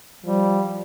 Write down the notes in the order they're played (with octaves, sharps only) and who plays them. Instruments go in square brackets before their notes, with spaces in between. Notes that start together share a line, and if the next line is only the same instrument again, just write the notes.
[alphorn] F3 [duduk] G3